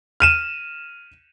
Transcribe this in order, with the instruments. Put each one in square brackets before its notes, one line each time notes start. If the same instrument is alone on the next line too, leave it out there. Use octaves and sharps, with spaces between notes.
[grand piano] F6 D#7 E7